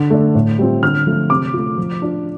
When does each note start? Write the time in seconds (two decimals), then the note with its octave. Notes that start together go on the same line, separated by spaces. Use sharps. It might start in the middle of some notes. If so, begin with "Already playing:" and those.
Already playing: D3
0.10 A3 D4
0.35 A2
0.59 G3 C4 F4
0.83 D3 F6
1.06 F3 A3 F4
1.30 C3 D6
1.54 A3 F4
1.78 F3
2.02 D4 F4